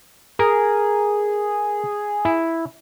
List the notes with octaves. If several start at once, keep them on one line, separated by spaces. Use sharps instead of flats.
G#4 A#4
E4